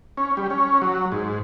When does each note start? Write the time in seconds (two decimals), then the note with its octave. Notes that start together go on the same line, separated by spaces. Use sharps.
0.17 C#4
0.37 G3
0.50 C#4
0.82 F#3
1.12 G#2